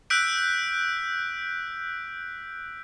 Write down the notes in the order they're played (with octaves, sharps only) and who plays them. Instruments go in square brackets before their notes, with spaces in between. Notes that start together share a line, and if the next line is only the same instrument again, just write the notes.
[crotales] E6 F#6 G6 B6 D7